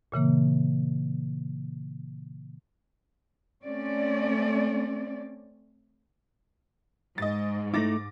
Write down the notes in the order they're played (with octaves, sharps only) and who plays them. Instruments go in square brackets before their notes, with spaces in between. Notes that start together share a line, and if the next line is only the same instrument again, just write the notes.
[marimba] A#2 C#3 E3 A#3
[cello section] A3 C4 C#4 D5
[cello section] G#2 [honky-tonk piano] D#5 A6
[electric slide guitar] A3 D#4 E4 [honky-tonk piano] D6 A6 A#6